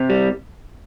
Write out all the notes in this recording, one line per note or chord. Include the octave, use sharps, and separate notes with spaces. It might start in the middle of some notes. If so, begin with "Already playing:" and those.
Already playing: C3
G3